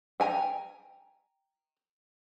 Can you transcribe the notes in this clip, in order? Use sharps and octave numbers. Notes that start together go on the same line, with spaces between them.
G5 G#5 A#5